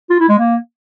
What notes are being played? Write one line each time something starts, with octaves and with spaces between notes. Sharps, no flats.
F4
E4
G#3
A#3